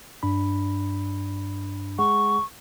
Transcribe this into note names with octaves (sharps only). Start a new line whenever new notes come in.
G2 D4 B5
G#3 G#4 F#5 C#6